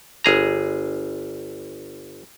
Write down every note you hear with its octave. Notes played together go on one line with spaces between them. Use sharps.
G1 G#4 A#5